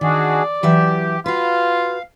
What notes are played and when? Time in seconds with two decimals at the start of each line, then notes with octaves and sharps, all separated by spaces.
0.01 D#3 D4 F#4 G#4 D5
0.63 E3 F#3 G4 E5
1.26 F4 F#4 B4 F5